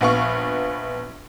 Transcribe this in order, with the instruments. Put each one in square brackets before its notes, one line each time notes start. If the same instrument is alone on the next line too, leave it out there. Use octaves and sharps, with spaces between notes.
[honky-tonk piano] A#1 B3 F5 C#6